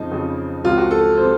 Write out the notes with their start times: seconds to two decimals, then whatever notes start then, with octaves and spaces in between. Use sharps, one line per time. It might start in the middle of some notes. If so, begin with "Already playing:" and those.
Already playing: F2 C#3 F3 D#4
0.11 F2 C#3 F3
0.64 C#2 C3 F3 F4
0.78 F#4
0.91 A4
1.17 C3 F3 C5